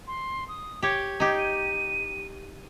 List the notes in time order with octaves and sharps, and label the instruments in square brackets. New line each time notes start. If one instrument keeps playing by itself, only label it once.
[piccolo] C6
D#6
[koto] G4 C#5 [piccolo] G#6
[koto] D#4 G4
[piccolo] D#7